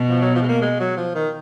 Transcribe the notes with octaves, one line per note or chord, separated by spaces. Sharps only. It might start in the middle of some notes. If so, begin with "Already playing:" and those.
Already playing: B2
F3
F#3
F3
G#3
A#3
G#3
F#3
F3
D#3